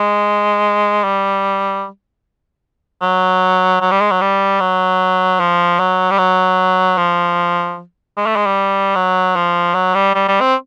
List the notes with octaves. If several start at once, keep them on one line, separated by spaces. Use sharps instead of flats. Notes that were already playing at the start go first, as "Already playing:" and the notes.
Already playing: G#3
G3
F#3
F#3
G3
G#3
F#3
G3
F#3
F3
F#3
G3
F#3
F3
G#3
A3
G#3
G3
F#3
F3
F#3
G3
G3
G3
C4